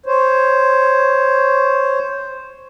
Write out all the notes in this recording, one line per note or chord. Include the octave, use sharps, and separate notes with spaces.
C5 C#5